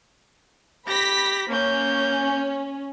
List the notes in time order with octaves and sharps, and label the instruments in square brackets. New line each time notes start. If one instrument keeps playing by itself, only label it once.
[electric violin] G4 [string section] B5 A#6 B6
[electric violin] A#3 G6 [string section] C#4